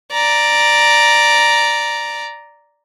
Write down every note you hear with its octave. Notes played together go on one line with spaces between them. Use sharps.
D5 A#5